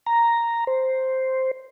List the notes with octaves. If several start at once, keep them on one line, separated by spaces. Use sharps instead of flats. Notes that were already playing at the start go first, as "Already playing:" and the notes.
A#5
C5